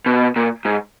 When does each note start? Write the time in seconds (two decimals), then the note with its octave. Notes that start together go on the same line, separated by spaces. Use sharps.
0.06 B2
0.36 A#2
0.65 G#2